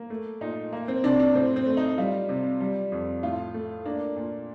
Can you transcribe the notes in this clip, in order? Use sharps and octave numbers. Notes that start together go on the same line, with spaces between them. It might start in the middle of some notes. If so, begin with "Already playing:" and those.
Already playing: A#3
A3
A#2 D#4
A#3
C4
C3 D4
D4
A2 C4
C4
A3
D#4
G3 F4
C3
G3
F2
A2 F4
A3
A#3 D4
A#2